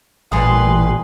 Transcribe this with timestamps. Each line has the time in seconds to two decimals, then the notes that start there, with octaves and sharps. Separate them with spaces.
0.32 A1 A#2 G3 B4 G#5 C6 D#6